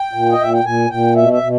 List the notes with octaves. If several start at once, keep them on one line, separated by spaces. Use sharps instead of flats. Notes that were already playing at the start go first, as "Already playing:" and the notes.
Already playing: G5
A#2
D#5
A#2 E5
G5
A#2 G#5
A#2 G5
B2 E5
E5
B2